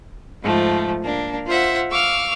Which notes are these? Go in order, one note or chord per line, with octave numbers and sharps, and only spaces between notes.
G#2 F3 A3
A#3 D4
F4 C5 E5 F#5
F5 C#6 D6 E6 F6